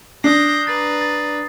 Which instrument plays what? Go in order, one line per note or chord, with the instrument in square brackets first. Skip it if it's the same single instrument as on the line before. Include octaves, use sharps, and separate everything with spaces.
[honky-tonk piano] D4 [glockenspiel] D#6 C7 [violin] G6 A#6
[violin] B4 A#5 [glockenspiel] A6
[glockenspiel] A6